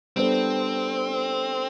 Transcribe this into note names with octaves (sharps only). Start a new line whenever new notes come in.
G3 B3 C4 D4 A4 C5